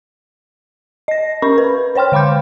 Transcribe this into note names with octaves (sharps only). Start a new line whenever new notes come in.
D#5 A#6
C#4 A#4 B5 C#6
B4
C5 C#5 G5 C6 F6
D3 F5 B5 D6 G6